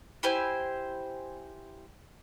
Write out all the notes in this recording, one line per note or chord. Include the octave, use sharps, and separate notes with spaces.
E4 G4 C5 G#5